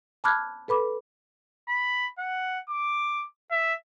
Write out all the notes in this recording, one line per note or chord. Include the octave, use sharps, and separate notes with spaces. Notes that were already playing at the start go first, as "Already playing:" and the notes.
A5 B5 D6 F6 F#6 G#6
A4 B4 B5 D6
B5
F#5
D6
E5